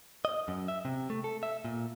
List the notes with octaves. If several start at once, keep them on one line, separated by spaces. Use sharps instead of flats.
D#5
F#2
E5
C3
A3
A4
E5
A#2